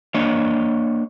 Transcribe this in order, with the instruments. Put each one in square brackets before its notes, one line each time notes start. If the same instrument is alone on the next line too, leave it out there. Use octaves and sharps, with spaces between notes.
[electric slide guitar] A#3 D4 C#5 D#5